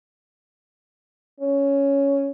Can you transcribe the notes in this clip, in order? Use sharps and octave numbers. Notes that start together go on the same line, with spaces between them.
C#4